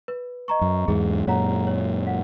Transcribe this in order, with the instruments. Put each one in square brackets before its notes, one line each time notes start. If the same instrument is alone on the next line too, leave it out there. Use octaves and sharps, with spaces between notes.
[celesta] B4
D#5 A#5 C#6
[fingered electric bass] F#2
[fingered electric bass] E2 G#2 [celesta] G#4
[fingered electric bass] F#2 A#2 [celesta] C#5 F#5 A#5
[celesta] C#5
F#5